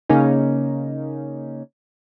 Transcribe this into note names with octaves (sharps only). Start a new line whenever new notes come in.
C#3 A#3 C#4 D#4